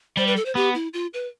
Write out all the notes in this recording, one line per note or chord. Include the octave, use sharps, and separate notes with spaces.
G3 C5
B4
A4
C5
B3 G4
E4
F4
B4